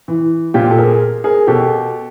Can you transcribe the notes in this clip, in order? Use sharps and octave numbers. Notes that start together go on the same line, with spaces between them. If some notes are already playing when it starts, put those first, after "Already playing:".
E3
A#2 F4 G4
A4
G#4 A#4
G#4 A#4
B2 G4 A4